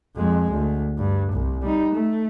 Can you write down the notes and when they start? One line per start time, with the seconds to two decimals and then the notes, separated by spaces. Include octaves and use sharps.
0.16 F2 G#3
0.51 D2
0.98 G2
1.33 C2
1.62 G3 D#4
1.93 A3